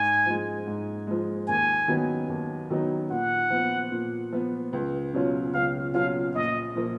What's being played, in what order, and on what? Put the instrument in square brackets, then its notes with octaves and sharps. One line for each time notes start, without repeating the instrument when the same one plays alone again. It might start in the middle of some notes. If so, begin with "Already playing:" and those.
Already playing: [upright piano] G#2 [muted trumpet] G#5
[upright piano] F3 G#3
G#2
F3 G#3
[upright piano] D#2 [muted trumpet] G#5
[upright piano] D#3 F#3 B3 D#4
D#2
D#3 F#3 B3 D#4
[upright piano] A#2 [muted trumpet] F#5
[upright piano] F3 B3
A#2
F3 B3
C#2
B2 F#3 C#4 F4
[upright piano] C#2 [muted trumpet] F5
[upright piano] B2 F#3 C#4 F4 [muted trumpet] F5
[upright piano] A#1 [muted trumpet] D#5
[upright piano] A#2 F3 A#3